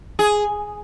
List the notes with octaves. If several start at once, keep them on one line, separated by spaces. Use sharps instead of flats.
G#4